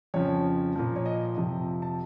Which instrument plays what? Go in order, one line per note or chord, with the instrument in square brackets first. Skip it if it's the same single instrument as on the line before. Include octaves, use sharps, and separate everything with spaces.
[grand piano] F2 C#3 F3 C#5
A#2 F3
C#5
D#5
F2 C3 F3
A5